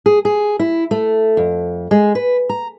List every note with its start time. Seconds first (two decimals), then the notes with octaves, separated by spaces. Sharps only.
0.06 G#4
0.25 G#4
0.59 E4
0.91 A3
1.37 F2
1.91 G#3
2.15 B4
2.49 A#5